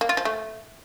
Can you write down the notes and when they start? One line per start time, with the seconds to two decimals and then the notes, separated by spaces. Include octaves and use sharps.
0.01 A#3
0.09 F4
0.17 F3
0.25 A3